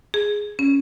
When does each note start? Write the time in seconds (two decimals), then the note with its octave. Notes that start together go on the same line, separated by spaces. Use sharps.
0.14 G#4
0.59 C#4